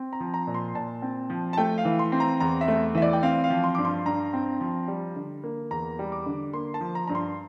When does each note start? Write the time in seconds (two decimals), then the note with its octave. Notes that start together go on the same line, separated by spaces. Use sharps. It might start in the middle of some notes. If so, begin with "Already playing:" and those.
Already playing: C4
0.13 A#5
0.20 F3
0.34 A#5
0.47 A#2
0.54 C6
0.75 A#2 A5
1.02 C4
1.30 F3
1.53 A5
1.57 A3 G5
1.78 F5
1.85 E3
1.99 C6
2.12 C4
2.20 A#5
2.40 E2 A#5
2.61 E5
2.68 A3
2.95 E3 E5
3.02 D5
3.13 G5
3.23 C4 F5
3.44 F5
3.50 F3
3.64 C6
3.75 G2 D6
3.85 C6
4.06 G2 A#5
4.34 C4
4.61 F3
4.88 G3
5.16 D3
5.44 A#3
5.71 E2 A#5
5.99 G3
6.12 D6
6.26 D3
6.53 A#3 C6
6.74 A5
6.81 F3
6.95 A#5
7.07 G2 A#5
7.15 C6